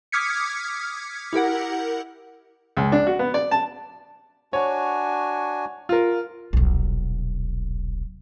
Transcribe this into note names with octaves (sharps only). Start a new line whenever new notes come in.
D6 D#6 F6 G#6 B6 C#7
E4 G4 A#4 F#5
C#2
D4
F#4
B3
D5
A5
D4 F#4 C#5 G#5
F4 A#4
D#1 B1